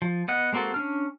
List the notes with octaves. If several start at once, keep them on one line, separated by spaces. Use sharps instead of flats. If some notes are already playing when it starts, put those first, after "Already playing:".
F3
B3 D#5 F#5
G#3 A#3 C4 F#4 A4
C#4 D4 F6